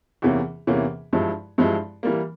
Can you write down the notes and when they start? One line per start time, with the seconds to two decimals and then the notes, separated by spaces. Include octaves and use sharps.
0.22 E2 C3 E3 A#3 C#4
0.67 E2 C3 E3 A#3 C#4
1.13 G2 F3 G#3 E4
1.58 G2 F3 G#3 E4
2.03 E3 G3 A#3